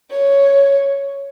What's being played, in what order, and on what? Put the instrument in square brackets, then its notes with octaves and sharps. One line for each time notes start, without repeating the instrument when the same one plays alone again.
[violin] C#5